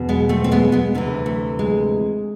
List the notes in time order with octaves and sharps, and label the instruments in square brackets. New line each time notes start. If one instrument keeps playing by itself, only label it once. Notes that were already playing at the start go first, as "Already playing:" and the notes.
Already playing: [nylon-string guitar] E2 B2
G#3 B3
A3 C4
C4
G#3 B3
G#3 B3
D2 C3 E3
A3
G#3